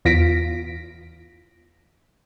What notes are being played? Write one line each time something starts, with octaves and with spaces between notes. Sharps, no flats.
E2 F4 A#6 B6 D7